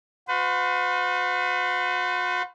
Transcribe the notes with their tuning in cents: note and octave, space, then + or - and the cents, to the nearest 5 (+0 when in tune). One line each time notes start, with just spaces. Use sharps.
F#4 -40 B4 +45